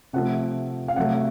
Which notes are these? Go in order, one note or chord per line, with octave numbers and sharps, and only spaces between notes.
C3 F3 A3 F#5
F5
C3 F#3 A3 F#5